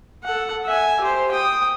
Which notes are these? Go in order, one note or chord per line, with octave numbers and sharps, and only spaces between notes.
A4 F#5
E5 G#5
G4 C5
G5 D#6